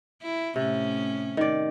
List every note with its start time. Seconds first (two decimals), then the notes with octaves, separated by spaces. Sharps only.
0.23 E4
0.56 A2 C3 C#4
1.37 D#3 D5